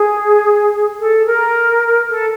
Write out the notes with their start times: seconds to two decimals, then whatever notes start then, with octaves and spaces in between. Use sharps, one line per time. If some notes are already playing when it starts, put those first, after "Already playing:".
Already playing: G#4
0.99 A4
1.26 A#4
2.09 A4